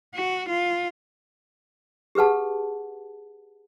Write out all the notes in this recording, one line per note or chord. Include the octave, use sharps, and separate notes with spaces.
F#4
F4
G4 G#4 B4 F#5 A5